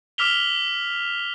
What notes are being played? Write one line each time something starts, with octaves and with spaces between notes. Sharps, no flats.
D6 E6 F6 B6 F7 G7